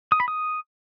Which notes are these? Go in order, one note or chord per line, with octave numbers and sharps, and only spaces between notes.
D#6
B5
D#6